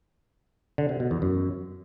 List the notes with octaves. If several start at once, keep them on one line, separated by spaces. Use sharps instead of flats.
D3
C3
B2
E2
F#2